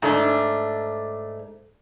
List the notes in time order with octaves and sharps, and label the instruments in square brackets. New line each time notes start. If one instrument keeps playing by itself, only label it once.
[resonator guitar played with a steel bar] G#2 A3 D4